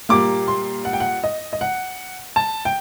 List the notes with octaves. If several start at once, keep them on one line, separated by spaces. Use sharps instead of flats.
A#2 G3 A#3 D6
C6
F#5
G5
F#5
D#5
D#5
F#5
A5
G5